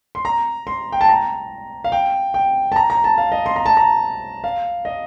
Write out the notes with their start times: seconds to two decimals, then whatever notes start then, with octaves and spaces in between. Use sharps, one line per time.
0.15 C6
0.25 A#5
0.67 C6
0.92 G5
1.01 A5
1.09 A#5
1.84 F5
1.92 G5
2.34 G5
2.72 A5
2.76 A#5
2.90 A#5
3.04 A5
3.18 F5
3.32 D#5
3.46 C6
3.56 A#5
3.66 A5
3.77 A#5
4.44 F5
4.85 D#5